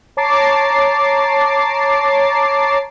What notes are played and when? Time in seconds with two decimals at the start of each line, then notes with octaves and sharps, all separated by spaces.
0.17 C#5 A5 A#5 D6 A6 C7